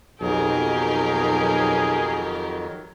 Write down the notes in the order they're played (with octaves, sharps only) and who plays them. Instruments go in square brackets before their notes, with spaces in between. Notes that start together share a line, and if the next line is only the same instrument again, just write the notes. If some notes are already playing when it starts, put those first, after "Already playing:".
[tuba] B1 [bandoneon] F2 D#3 F#3 [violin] G4 A#4 [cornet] G#4